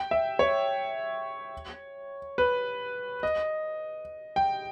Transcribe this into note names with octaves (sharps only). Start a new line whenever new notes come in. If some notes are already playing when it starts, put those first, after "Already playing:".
Already playing: G5
E5
C#5
B4
D#5
G5